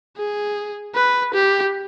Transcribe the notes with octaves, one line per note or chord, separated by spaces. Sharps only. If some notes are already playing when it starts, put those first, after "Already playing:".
G#4
B4
G4